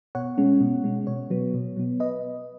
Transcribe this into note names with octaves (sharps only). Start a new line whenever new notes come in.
B2 C#5 F#5
G#3 C#4
B2
G#3 C#4
B2 C#5
F#3 B3
B2
F#3 B3
B4 D#5